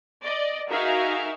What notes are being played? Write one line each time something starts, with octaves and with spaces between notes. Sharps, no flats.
D5 D#5
D#4 F#4 G#4 A#4 E5 F5